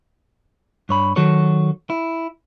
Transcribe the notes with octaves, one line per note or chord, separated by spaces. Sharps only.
G2 C#5 B5
D#3 F#3 F#4 A4 C#5
E4